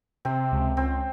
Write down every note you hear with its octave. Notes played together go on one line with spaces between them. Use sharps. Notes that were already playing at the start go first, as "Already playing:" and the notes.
C3 C4
C#2
C#2 C4